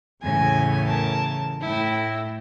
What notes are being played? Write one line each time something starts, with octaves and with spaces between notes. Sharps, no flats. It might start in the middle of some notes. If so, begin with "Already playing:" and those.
E2 A2 C#3 G#5
A#4 A5
A2 E4 G5